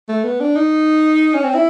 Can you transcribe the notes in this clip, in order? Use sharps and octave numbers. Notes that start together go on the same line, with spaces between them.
A3
B3
D4
D#4
C#4
C4
E4